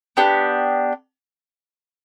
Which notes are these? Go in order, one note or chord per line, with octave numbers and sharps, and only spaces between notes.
B3 D4 G4